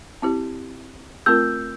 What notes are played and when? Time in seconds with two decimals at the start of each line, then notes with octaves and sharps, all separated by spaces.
0.22 C4 E4 G4
1.26 A3 C4 F4 A#4 E6 G6